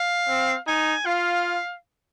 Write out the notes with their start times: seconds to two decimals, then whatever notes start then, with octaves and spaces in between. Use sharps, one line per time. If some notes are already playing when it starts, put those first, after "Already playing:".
Already playing: F5
0.28 C4
0.67 D#4 G#5
1.06 F4 F5